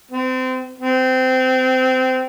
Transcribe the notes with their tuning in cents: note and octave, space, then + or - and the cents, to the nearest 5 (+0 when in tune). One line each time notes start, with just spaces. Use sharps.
C4 -30
C4 -20